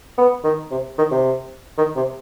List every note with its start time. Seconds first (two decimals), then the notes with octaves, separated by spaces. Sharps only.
0.18 B3
0.44 D#3
0.71 C3
0.98 D#3
1.11 C3
1.78 D#3
1.96 C3